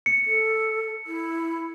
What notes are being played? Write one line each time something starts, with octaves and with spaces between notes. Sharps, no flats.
C#7
A4
E4